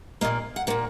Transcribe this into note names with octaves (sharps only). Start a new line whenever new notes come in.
A#2 A#3 D#5
F#5
A#2 A#3 F#5